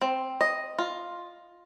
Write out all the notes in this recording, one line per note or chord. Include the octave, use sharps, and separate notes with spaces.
C4
D#5
F4